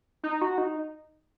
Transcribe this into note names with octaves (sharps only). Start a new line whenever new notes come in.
D#4
F#4
D#4